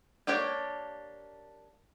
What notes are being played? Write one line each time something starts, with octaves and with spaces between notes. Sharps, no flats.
A#3 D4 G4 C#5